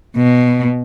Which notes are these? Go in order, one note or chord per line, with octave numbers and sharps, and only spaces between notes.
B2